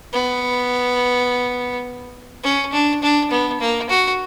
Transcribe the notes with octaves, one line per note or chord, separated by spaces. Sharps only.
B3
C#4
D4
D4
B3
A#3
F#4